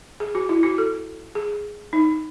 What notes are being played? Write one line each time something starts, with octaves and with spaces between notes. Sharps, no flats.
G#4
F#4
E4
F#4
A4
G#4
D#4